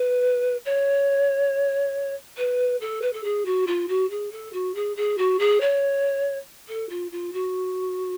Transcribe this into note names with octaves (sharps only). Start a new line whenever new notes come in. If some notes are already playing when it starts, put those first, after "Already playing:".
Already playing: B4
C#5
B4
A4
B4
A4
G#4
F#4
F4
F#4
G#4
A4
F#4
G#4
G#4
F#4
G#4
C#5
A4
F4
F4
F#4